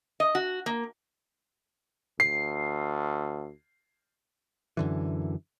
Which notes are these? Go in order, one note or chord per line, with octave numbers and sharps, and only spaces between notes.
D#5
F#4
A#3
D2 C7
F#2 D3 E3